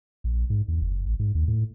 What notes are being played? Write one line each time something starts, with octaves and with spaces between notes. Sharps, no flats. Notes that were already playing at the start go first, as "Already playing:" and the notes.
A#1
G#2
E2
F#1
A1
G#2
D#2
A2